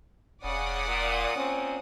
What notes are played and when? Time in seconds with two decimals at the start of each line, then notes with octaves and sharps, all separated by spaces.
0.44 E1 C#3 D5 F#5 D#6
0.87 A#2
1.35 A#2 C4 C#4